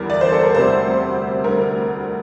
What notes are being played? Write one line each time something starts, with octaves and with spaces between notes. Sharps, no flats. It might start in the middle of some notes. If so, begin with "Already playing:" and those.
Already playing: E2 D3 G3 A#4
D5
C5
A4
A#4
D2 C3 G3 C5
D2 D3 G3 A#4